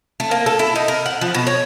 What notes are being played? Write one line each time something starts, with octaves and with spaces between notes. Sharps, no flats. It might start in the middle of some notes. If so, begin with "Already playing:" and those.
A3
A#3
A4
E4
D#4
A#4
F#5
F3
B2
C#5